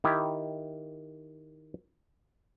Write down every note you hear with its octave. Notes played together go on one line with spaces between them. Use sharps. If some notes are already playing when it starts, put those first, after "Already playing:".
D#3 E4 G4